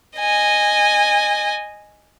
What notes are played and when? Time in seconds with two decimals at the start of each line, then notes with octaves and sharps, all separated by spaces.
0.18 D#5 G#5